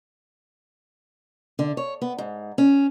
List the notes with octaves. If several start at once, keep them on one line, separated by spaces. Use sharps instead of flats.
D3
C#5
B3
G#2
C#4